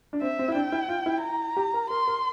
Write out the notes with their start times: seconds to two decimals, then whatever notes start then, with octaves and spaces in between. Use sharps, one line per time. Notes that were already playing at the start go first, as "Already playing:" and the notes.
0.13 D4
0.22 C4 E5
0.39 C4
0.48 E4
0.55 D4 G5
0.72 E4
0.89 F4
1.06 E4
1.22 A#5
1.57 G4
1.74 A#4
1.90 A#4 C6
2.07 A#4